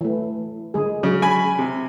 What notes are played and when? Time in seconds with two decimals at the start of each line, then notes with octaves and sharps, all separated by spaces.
0.01 E3 A3
0.74 D3 G#3 G#4
1.03 C#3 F#3
1.22 G#5 B5
1.59 C3